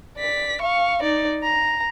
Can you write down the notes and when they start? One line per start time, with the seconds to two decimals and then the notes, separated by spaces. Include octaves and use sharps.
0.17 D5 B6
0.61 F5 C#6
1.02 D#4 D5
1.43 A#5